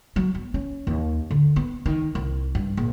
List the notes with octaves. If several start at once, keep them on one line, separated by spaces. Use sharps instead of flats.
F#3
B3
C#4
D#2
D3
B3
D#3
C2
G2
A#1